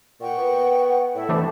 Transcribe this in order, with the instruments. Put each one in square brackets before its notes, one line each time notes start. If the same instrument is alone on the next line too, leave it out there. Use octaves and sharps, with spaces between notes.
[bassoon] A#2 [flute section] F#5 G5 C#6
[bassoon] B3
[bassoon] A2 [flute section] E4 A4
[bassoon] C3 [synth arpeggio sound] E3 A3 D4